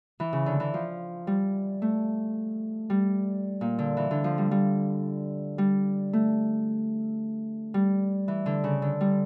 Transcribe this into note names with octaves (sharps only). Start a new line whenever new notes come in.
E3
C#3
D3
E3
F3
G3
A3
G3
A#2
D3
E3
D3
F3
G3
G3
G3
A3
G3
E3
D3
C#3
D3
G3